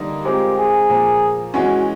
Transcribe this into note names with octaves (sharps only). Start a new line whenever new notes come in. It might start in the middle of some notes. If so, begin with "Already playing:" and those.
Already playing: D3 G3 A#3 D#4
G#3 C4 F4 G4 A#4
G#4
A#2 F3 A#3
E3 G#3 C#4 F#4